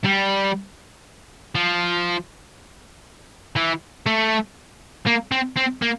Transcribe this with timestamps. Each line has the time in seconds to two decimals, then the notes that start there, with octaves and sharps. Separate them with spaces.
0.04 G3
1.55 F3
3.56 E3
4.06 A3
5.07 A#3
5.32 C4
5.57 C4
5.82 A#3